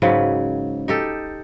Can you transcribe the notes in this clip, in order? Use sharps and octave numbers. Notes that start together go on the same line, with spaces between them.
G#2 C#3 F#3 B4
D#4 G4 A4